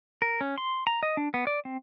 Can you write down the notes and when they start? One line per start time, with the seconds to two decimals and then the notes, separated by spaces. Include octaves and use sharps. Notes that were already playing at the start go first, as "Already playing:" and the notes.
0.22 A#4
0.41 C#4
0.58 C6
0.87 A#5
1.03 D#5
1.17 D4
1.34 B3
1.47 D5
1.65 C4